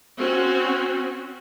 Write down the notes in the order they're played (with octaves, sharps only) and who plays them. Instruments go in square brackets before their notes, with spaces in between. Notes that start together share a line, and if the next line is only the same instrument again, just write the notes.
[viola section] C4 C#4 F#4